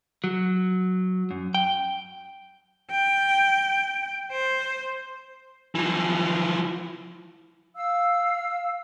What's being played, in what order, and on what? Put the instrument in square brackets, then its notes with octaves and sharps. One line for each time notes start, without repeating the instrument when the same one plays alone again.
[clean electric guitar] F#3
F#2
G5
[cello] G5
C5
[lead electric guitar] E3 F3
[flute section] F5 E6